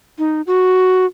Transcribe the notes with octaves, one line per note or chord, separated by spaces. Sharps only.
D#4
F#4